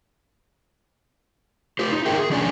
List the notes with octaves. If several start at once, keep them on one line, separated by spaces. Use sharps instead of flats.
F4 G4 C5
D#4
F4 G#4 A#4 E5 G5
G#4
D#3 F3 C#4 D4 F4 G#5